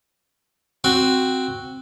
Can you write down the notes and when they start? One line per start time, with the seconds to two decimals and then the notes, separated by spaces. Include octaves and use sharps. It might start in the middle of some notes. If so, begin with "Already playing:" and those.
0.84 C4 F#4